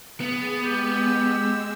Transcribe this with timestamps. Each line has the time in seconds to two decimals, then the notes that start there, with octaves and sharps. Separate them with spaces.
0.21 B3 G#4
0.64 G#3 G4 E6